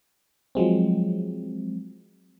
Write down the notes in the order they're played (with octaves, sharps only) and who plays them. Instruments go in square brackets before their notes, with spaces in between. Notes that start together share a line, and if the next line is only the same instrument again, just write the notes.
[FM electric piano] F3 F#3 G#3 C4